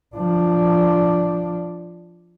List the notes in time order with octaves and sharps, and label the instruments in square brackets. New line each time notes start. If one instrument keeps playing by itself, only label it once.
[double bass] F3 D4